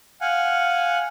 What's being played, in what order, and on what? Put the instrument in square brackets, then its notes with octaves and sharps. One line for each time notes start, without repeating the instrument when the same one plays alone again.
[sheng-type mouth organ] F5 F#5 G#5